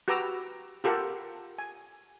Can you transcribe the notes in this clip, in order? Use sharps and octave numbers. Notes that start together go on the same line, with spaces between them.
F#4 G4 B4 A#5 D6 E6
F4 G4 A4 A#4 F#5
G#5